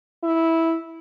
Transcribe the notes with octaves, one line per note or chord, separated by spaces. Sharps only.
E4